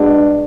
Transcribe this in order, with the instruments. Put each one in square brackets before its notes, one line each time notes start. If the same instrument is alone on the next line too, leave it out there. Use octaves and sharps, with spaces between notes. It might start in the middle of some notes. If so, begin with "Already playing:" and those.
Already playing: [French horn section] B2 G#3 D4